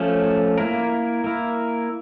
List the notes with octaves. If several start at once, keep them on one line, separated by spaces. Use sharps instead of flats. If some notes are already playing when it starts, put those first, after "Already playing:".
Already playing: F3 A3 C#4
A#3 E4 A#4
A#3 E4 A#4